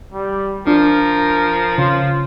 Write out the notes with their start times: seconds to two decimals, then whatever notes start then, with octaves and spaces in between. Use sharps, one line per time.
0.14 G3
0.67 F3 D4 A#4
1.78 C#3 F4